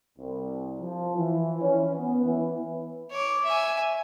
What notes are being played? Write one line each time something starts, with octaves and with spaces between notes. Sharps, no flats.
C2
F3
E3
C#4
B3
E3
C#5 D6
E5 G#5